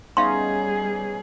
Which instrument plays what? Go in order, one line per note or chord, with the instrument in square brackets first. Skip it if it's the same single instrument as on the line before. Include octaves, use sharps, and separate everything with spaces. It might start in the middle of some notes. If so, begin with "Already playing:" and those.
[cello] G3 G#4 [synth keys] B3 C#4 D#4 [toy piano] E5 F5 C6